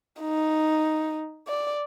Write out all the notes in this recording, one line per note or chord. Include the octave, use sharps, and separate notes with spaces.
D#4
D5